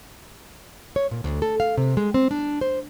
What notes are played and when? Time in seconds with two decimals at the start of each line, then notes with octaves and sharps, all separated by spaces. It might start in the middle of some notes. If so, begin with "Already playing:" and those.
0.96 C#5
1.11 A#2
1.24 D2
1.42 A4
1.60 F5
1.78 C3
1.97 G#3
2.14 C4
2.31 D4
2.61 C5